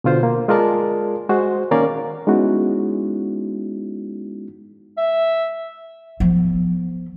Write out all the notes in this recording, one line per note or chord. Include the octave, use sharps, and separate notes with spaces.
B2 D3 F4 C5
A#3
G#3 F4 G#4 A#4 D5 A5
G#3 F#4 C5
D#3 A#3 C#4 A#4 D5 F5
G#3 B3 C#4 D#4 E4 F#4
E5
F3 B3